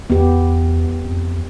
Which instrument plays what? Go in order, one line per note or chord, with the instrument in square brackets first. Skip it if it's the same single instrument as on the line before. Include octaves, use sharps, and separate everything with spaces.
[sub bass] E2 [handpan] B3 G4
[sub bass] F2